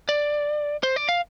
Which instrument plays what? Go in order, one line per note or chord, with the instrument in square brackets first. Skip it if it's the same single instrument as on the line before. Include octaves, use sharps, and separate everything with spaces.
[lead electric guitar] D5
C5
D5
F5